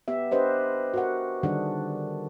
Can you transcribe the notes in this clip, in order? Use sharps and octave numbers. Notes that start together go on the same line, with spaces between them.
B3 G4 E5
D4 G4 B4 C5 D#5
F#4 A#4 F#5
D3 D#3 G3 D4 G#4 F#5